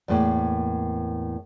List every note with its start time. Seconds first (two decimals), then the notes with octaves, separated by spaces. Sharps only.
0.08 E2 A2 A#3